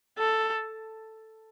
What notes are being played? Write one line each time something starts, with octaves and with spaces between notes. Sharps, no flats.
A4